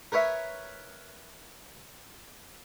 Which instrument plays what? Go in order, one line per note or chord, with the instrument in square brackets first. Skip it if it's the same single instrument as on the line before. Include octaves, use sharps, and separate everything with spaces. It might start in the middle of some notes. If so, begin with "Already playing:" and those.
[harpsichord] A#4 B4 C#5 E5